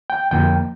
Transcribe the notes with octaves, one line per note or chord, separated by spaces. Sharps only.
G5
F2 D3 F3 A#3 G5